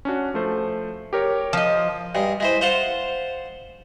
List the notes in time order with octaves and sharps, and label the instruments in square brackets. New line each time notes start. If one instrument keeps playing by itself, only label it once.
[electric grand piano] C#4 D4 F#4
F3 A3 C5
G4 A#4 C#5
[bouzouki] F3 D#5
[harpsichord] G2 G#3
G#3 E4 C5
C5 F5 F#5 A5 C6